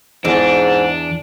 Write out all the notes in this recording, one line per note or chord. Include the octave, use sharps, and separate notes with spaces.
E2 G#2 D4